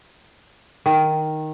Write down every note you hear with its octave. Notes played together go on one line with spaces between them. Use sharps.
D#3